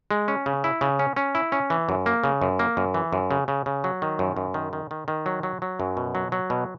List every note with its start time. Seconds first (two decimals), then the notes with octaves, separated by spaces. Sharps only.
0.11 G#3
0.28 C#4
0.46 C#3
0.64 E4
0.81 C#3
0.99 C#4
1.16 C#4
1.35 E4
1.52 C#4
1.70 E3
1.89 F#2
2.06 A#3
2.24 C#3
2.42 F#2
2.59 A#3
2.77 F#2
2.94 E3
3.13 F#2
3.31 C#3
3.48 C#3
3.66 C#3
3.84 F#3
4.02 D#3
4.19 F#2
4.36 F#2
4.54 D#3
4.73 D#3
4.91 D#3
5.08 D#3
5.26 F#3
5.43 F#3
5.62 F#3
5.80 F#2
5.97 B2
6.15 F#3
6.32 F#3
6.50 B2